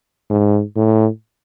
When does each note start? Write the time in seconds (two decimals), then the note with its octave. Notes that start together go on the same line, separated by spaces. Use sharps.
0.30 G#2
0.76 A2